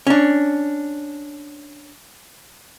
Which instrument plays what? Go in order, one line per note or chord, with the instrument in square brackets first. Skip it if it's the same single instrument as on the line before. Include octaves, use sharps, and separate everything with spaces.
[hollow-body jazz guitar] C#4 D4